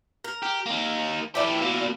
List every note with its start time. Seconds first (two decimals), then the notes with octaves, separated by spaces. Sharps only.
0.24 A#4
0.42 G4
0.66 A#3 D#4
1.35 E3 E4 G4 D5
1.61 B2 A#3